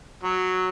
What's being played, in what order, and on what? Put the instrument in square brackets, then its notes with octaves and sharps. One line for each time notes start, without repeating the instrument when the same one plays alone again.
[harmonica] F#3